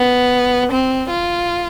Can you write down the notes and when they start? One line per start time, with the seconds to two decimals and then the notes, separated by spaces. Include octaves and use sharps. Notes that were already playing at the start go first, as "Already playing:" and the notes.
Already playing: B3
0.71 C4
1.09 F4